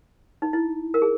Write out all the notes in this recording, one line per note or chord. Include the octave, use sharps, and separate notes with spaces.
D#4
E4
A#4
G#4